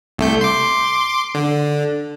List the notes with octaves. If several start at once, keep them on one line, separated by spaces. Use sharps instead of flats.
C2 A3 G6
C6 D6
D3